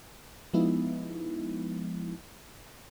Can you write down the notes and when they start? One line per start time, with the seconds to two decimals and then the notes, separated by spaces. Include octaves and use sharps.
0.54 F3 G#3 B3 D#4 E4